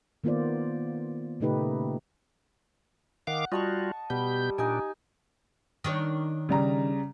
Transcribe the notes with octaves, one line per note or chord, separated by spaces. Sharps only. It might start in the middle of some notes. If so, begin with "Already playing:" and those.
D#3 A#3 B3 F4 C5 D5
A#2 C#3 A3 D#4 G4 B4
D#3 F5 F#5 D6
G3 F4 F#4 D#5 A5 C#6
B2 G3 B3 G6
A#2 D4 D#4 G4 G#5
D#3 D4 C#5
C#3 G3 A#5